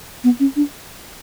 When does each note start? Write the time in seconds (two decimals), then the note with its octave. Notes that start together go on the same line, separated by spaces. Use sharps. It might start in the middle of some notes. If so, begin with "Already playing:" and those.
0.23 B3
0.39 C#4
0.56 D4